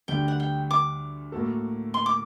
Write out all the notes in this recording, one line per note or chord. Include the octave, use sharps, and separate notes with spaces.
D2 D3 G3 G5
F#5
G5
D6
A2 F#3 A#3 F#4 A4
C6
D6